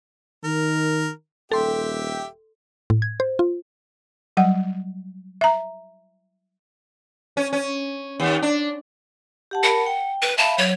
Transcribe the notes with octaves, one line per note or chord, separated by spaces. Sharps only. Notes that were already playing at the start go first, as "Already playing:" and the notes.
D#3 A#4
D#1 G4 A4 E5 G5 C6
A2
G#6
C5
F4
F#3 G3 F#5
E5 A#5
C#4
C#4
D#2
D4
G4 F#5 A5
A#4 F#5 A5 B5
G5
B4
E5 F5 A5 B5
F#3 C#5